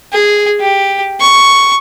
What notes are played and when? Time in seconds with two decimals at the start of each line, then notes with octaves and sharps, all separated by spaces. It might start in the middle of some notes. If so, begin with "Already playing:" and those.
0.13 G#4
0.60 G4
1.21 C#6